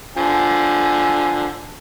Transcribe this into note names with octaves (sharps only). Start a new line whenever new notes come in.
D3 F3 G#5